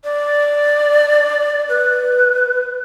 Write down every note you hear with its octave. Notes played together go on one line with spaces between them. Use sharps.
D5
B4